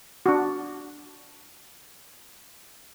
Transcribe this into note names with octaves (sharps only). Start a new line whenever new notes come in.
D4 F#4